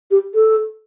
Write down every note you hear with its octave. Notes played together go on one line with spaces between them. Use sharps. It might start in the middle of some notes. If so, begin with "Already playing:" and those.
G4
A4